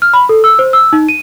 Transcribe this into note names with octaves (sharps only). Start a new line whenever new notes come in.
F6
B5
A4
E6
C5
E6
D#4
D#7